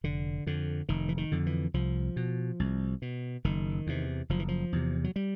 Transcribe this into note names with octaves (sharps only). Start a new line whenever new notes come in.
F1 D3
F2 D3
F1 D#3
E3
D#3
F2 D3
E3
C2 F3
B2
C2
B2
F#1 D#3
E2 C3
F#1 F3
E3
F3
E2 C3
F#3
G3